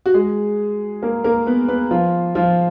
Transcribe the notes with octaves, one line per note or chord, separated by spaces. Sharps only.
F#4
G#3 G#4
A#3 A#4
A#3 A#4
B3 B4
B3 B4
F3 F4
F3 F4